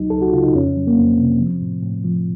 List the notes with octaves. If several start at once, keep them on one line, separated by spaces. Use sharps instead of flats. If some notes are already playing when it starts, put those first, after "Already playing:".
Already playing: C#2 F#3 D#4
C#2 A4
F#4
C#3 F4
D#4
F2 C#4
F#3
A#3
F2 C4
C3
F3
A2
A2
F3